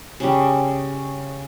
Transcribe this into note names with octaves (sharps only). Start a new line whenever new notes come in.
C#3 G3